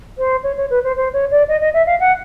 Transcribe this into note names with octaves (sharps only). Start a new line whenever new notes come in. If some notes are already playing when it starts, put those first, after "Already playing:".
C5
C#5
C#5
B4
C5
C5
C#5
D5
D#5
D#5
E5
F5
F#5